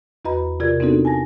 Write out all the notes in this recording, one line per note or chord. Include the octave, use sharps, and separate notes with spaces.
E2 F#4 B4 D#5 A#5 B5
C3 F4 G4 A#4 D5 G#6
B3 C4 D4 D#4 F#4 A4
G#5 A5 A#6